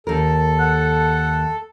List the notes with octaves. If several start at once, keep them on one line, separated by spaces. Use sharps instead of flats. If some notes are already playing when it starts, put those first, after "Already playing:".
D#2 A4 A#4
F#5